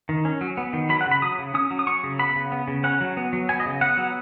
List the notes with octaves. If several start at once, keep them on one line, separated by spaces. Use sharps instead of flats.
D#3
C#4
F#3
B3
D#3
F#3 B5
F#5
C#3
B5
F#3 D#6
C#3
C#4 D#6
F#3
D#6
F#3 C#6
C#3
B3 B5
C#3
B3
C#3
C#4 F#5
F#3
B3
F#3
B3 G#5
D#5
C#3
B3 F#5
F#3